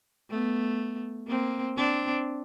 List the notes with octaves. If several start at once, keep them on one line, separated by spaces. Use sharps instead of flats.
A3 B3
A#3 C4
C4 D4